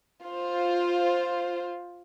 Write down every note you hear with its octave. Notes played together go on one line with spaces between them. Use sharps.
F4 C5